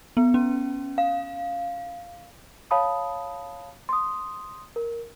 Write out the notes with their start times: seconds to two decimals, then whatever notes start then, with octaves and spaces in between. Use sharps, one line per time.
0.17 B3
0.34 C#4
0.98 F5
2.71 C#5 F5 A5 B5 D#6
3.89 C6 D#6
4.76 A#4